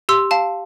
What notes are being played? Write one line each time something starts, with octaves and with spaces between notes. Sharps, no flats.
G4 C6 E6
F5 A5